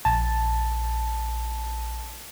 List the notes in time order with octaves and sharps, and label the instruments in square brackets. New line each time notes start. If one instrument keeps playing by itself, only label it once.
[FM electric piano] A#1 A5